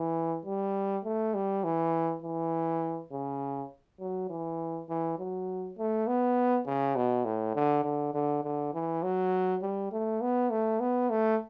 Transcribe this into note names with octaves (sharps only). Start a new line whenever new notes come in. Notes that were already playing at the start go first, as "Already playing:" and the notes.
Already playing: E3
G3
A3
G3
E3
E3
C#3
F#3
E3
E3
F#3
A3
B3
C#3
B2
A2
D3
D3
D3
D3
E3
F#3
G3
A3
B3
A3
B3
A3